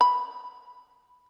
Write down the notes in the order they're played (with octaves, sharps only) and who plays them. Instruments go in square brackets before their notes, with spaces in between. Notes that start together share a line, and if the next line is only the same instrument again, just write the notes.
[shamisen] B5